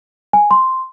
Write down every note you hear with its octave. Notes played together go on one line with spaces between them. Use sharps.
G#5
C6